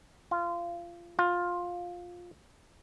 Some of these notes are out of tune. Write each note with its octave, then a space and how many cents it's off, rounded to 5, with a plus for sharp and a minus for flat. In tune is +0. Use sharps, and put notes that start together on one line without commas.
F4 -20
F4 +15